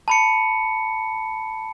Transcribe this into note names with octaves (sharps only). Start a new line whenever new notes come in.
A5 B5 C#7